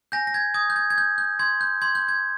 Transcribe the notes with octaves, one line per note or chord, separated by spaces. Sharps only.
G#5 G6 A#6
A#6
G#6
D#6 G#6
G6
G#6
G#6
G6
G6
C6 G#6
G6
C6 G#6
G6
G#6